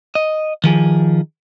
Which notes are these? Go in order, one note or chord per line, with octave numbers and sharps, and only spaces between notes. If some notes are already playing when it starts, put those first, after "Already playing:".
D#5
D#3 F3 G#4